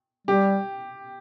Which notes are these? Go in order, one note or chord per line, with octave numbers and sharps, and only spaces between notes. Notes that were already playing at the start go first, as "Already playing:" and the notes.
G3 G4